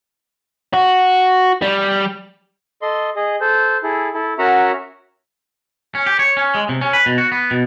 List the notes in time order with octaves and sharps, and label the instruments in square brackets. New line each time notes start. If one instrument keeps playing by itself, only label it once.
[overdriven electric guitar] F#4
G3
[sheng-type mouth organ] A4 D#5 C6
G#4 D#5
A4 C5
E4 G#4 A4
E4 A4
C#4 F#4 A#4 E5 F#5 A#5
[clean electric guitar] C#4
G4
C#5
C#4
G#3
C3
C#4
B4
B2
F#4
B3
B2